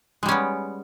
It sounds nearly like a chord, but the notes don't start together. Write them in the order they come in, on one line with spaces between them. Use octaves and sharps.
G#3 G3 C#4 B3